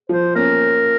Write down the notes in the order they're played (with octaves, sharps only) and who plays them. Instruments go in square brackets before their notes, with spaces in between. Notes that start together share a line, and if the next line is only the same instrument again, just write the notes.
[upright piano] F3 [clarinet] C5
[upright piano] A#3 C#4 [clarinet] A#4